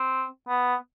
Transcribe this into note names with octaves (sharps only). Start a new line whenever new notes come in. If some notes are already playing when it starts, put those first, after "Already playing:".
Already playing: C4
B3